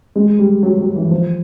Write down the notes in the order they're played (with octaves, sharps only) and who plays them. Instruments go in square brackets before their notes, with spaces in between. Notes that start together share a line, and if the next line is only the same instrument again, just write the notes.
[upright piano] G#3
G3
F#3
F#3
E3
F3